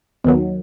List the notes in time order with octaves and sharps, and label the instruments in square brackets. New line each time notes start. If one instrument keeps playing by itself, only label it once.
[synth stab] D#2 D#3 F#3 [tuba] B3